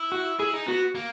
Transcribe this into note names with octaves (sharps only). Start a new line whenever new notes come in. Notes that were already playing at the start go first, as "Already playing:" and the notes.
Already playing: E4
F#4
E4 G#4
D#4
B3 F#4
A#3